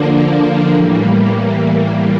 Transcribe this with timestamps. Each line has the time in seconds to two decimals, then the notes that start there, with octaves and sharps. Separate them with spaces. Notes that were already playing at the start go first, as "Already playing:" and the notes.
Already playing: D3 F3 A#3 D4
0.73 A2 E3 G3 A#3